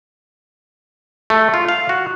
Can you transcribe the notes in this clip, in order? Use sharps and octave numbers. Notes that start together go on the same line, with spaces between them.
A3
F4
F5
F#4